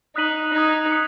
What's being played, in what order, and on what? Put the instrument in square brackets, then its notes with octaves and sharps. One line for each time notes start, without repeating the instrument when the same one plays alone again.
[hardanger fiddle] D#4 [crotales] D#6 F#6 B6 D#7 F#7
[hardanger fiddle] D#4 [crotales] D#6 G#6 B6 F#7
[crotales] D#6 F#6 C#7